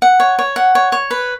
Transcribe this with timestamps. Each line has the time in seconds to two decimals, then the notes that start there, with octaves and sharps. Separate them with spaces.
0.02 F#5
0.20 C#5
0.39 C#5
0.56 F#5
0.75 C#5
0.92 C#5
1.11 B4